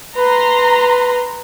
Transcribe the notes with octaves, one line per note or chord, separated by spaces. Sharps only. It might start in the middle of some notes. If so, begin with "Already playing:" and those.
B4 A#5 C6